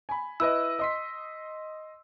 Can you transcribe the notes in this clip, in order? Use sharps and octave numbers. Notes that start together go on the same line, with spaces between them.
G#5 B5
E4 B4 D#5 E6
D#5 C6 B6